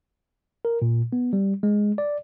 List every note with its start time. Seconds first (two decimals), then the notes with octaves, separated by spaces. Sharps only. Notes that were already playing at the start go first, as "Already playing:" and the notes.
0.65 A#4
0.82 A#2
1.13 B3
1.33 G3
1.63 G#3
1.98 D5